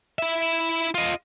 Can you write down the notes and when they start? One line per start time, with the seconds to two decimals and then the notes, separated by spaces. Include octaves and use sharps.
0.19 E4 E5
0.94 F4 D#5